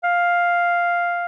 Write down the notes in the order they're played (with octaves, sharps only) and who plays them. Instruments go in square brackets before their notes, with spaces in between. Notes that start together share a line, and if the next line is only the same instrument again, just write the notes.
[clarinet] F5